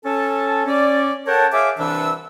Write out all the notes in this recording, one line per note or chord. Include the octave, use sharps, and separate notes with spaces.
C#4 A4 A5
C#4 D5
A4 A#4 C#5 F#5 G5 A5
G#4 C#5 E5 F5 D6
C2 E3 D4 B4 E5 E6